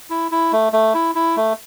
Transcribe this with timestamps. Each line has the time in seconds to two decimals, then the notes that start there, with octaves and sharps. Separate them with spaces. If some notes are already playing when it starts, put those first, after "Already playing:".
0.10 E4
0.31 E4
0.52 A3
0.73 A3
0.94 E4
1.15 E4
1.36 A3